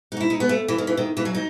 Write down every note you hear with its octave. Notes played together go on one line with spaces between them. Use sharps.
D#4 F#4
E4
D#4
B3
A3
E3
D#3
E3
D#3
E3
F#3
D#4